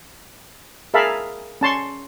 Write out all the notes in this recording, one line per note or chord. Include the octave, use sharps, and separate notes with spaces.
G#4 A#4 E5 F5 A5 B5
C#4 A5 C6 C#6